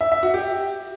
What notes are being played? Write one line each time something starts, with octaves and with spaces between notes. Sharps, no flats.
E5
E5
F#4
G4